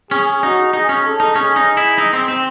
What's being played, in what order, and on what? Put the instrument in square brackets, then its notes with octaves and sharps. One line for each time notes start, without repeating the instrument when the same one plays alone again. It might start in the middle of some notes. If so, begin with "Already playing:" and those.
[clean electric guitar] C#4 [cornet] G#4
[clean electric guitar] D#4 [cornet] F#4
[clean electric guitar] D#4 [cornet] G#4
[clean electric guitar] C#4
[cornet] A4
[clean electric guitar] D#4
[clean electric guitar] C#4 [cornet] G#4
[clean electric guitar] D#4
E4
D#4
C4
C4